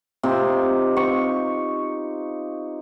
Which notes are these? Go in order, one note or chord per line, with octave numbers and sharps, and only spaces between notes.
C3 D#4 F4
C#6